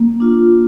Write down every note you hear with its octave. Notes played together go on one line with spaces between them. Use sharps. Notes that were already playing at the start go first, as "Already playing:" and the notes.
Already playing: A#3
D4 F4